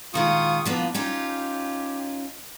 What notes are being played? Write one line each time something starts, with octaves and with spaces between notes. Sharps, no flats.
A#2 D#3 G#3 F4 C#6 D#6
F3 A#3 B3 D4
C#4 D#4 F4 G4